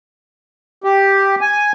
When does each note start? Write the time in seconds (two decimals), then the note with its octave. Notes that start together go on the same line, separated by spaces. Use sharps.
0.84 G4
1.41 G#5